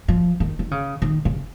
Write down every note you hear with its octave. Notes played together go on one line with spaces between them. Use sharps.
F3
D#3
D#3
C#3
D#3
C#3